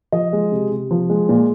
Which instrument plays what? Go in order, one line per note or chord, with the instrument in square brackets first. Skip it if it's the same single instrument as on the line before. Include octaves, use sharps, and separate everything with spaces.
[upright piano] F3 D#5
G#3
C3
C3
F3
G#3
A#2